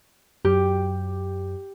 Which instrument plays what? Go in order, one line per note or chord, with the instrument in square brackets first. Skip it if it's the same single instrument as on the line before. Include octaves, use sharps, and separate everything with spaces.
[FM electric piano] F#2 [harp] G4